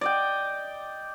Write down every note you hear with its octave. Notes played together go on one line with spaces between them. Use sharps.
D5 D#5 G5